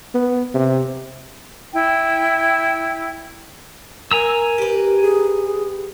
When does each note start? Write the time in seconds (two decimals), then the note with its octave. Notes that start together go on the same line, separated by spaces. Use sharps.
0.14 B3
0.54 C3
1.73 E4 G5
4.11 A#4 G#5 A#5 E6
4.58 G4 B4
5.01 G#4